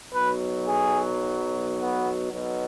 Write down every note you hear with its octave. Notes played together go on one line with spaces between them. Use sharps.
B1 B2 F#3 B4
G#4
B3
B1 B2 F#3